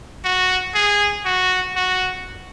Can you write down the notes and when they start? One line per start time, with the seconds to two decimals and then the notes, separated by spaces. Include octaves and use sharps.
0.24 F#4
0.75 G#4
1.26 F#4
1.76 F#4